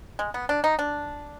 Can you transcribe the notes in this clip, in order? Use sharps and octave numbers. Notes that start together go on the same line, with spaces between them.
G#3
B3
D4
D#4
D4